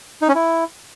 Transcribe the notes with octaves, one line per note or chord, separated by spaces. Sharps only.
D#4
C#4
E4